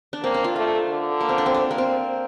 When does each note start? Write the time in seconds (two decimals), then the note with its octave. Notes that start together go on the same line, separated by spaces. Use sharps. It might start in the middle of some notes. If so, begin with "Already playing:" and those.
0.13 D4
0.22 A#3 C4
0.34 D4
0.44 F4
0.56 A3 F4
0.89 D3
1.21 A#3
1.29 C4
1.38 D4
1.46 C4
1.54 D4
1.71 A#3
1.78 C4